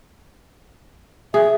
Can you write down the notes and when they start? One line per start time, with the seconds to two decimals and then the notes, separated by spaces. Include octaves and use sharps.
1.34 G#4 E5